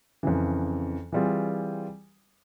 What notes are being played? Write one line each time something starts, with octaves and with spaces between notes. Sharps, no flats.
F2 C#3 E3
E3 G3 C4 F4 G#4